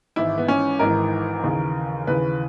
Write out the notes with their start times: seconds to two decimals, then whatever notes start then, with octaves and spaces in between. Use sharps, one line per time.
0.16 G#1 G#2 E3 E4
0.38 B3
0.48 C#4
0.79 G#1 G#2 E3 A#4
1.44 D#2 C#3 E3
2.07 D#2 C#3 E3 B4